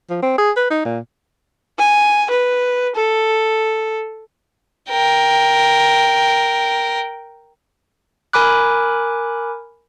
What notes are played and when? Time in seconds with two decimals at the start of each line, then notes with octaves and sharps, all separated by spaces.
0.10 F3
0.22 C4
0.38 G#4
0.57 B4
0.70 D#4
0.85 A#2
1.79 G#5
2.30 B4
2.95 A4
4.89 A#4 G5
8.33 A#4 G#5 B5 D6 F#6